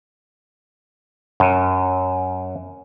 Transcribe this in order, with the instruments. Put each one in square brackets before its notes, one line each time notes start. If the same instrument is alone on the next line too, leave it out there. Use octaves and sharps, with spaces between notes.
[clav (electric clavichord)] F#2